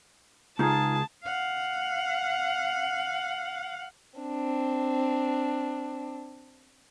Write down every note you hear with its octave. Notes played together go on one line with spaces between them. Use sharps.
C#2 D#4 F4 G#4 A5
F5 F#5
C4 D4